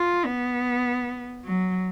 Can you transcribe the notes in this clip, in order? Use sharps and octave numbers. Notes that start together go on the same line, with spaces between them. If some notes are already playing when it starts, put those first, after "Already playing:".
Already playing: F4
B3
F#3